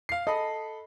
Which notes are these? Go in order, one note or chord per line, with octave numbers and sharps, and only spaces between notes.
F5 C7
A4 D#5 B5